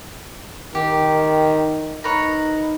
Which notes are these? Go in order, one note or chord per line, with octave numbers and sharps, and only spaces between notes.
D#3 G4
D#4 A#4 B4 C#5